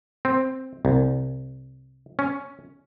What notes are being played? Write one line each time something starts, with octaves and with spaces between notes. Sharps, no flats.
C4
C2
C#4